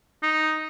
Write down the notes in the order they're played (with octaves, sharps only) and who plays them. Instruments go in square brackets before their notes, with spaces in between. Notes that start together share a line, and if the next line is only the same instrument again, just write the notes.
[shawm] D#4